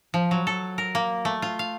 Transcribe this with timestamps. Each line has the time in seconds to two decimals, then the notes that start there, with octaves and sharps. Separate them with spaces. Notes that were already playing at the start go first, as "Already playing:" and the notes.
0.14 F3
0.31 F#3
0.47 A4
0.78 A#4
0.95 A#3
1.25 A3
1.42 F4
1.59 F5